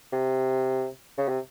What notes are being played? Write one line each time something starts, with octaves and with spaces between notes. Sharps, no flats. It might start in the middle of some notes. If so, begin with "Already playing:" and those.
C3
C#3
C3